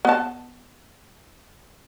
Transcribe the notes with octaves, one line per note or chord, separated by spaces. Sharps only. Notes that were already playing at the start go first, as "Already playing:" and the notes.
B3 A5